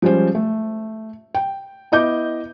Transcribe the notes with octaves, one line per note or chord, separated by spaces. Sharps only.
F3 G3 G#3 C#4 C5
A3
G5
B3 E4 D#5 D6 G6